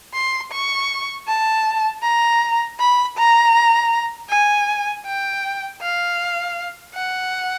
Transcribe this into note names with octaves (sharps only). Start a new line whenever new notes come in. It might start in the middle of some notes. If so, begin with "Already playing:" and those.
C6
C#6
A5
A#5
B5
A#5
G#5
G5
F5
F#5